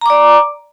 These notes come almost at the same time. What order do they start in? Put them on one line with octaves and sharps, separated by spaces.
A#5 D6 D5